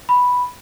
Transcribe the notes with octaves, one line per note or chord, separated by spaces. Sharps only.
B5